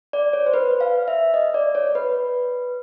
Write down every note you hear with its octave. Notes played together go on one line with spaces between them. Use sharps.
D5
C#5
C5
B4
F5
E5
D#5
D5
C#5
B4